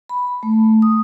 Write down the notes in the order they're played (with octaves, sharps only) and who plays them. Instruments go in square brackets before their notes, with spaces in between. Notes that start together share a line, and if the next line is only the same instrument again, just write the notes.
[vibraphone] B5
A3
D#6